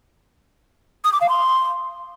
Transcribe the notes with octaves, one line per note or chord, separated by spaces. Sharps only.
D#6
D6
F5
C6